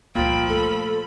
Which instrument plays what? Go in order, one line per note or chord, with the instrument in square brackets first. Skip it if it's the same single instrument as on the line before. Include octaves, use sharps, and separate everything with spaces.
[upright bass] C#2 G2 [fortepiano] A#2 [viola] F3 B5 [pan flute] G5
[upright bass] A3 [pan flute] A4